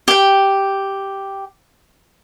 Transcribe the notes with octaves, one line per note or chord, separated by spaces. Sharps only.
G4 G5